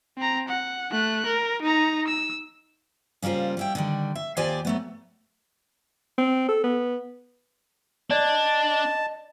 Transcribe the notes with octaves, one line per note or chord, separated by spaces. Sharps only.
C4 A#5
F#5
A3 F#6
A#4
D#4 A#5
E6
C#3 G3 A#3 F4 C5
G3 E4 G5
D3 D#3 G3
E5
D#2 F4 G4 C5 D5 G#5
F#3 A3 B3
C4
A4
B3
D4 D5 D#5 A5